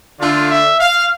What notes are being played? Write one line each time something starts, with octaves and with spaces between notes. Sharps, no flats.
D3 A3 D4 F4
E5
F5